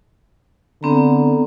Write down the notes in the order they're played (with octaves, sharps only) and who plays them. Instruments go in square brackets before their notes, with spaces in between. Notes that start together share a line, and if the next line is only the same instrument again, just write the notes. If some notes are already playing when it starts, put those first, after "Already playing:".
[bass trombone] D3 [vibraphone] B3 C4 A#5